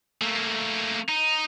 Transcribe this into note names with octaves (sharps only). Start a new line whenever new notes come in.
A3 A#3
D#4